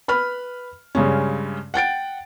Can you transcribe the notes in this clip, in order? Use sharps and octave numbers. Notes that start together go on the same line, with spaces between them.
B4 B5 F6
G2 C#3 G#3 C#4
F#5 G5 A6 D7